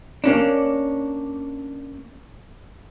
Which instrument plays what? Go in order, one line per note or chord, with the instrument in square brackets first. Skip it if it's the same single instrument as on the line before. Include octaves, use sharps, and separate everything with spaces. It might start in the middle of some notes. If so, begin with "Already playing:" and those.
[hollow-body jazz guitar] A#3 C#4 D4